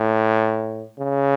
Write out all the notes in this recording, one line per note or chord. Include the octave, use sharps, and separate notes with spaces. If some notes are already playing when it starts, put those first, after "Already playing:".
Already playing: A2
C#3